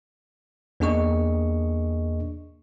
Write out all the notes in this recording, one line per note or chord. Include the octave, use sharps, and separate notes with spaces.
E2 A#3 D4 G#4 D#5 C#6